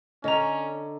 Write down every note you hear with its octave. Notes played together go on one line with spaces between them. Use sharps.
D3 C#4 D#5 A#5